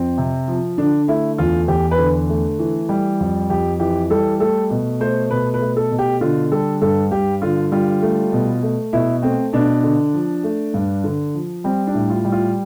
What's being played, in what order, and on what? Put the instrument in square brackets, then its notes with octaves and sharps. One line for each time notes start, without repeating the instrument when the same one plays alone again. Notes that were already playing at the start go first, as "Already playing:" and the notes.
Already playing: [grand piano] F2 C4
C3
F3
D3 D4
A3 E4
E2 F4
E2 G4
B4
D3
A3
E3
G3
F2
F2 G4
E3 G4
G3 A4
A3 A4
B2
A3 C5
B2 B4
B4
A3
A4
B2
G4
D3 F4
G3 A4
G2 A4
G2 G4
D3 F4
G3 F4
A3
B2
A3
B2 E4
A3 C4
B2 D4
D3
F3
A3
G2
D3
F3
G3 C4
D4
A2
F4
G3
F4